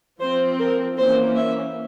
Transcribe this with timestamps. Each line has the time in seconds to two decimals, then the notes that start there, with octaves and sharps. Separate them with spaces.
0.20 F3 C4 C5
0.59 A#4
0.97 E3 A#3 C#4 C5
1.36 E5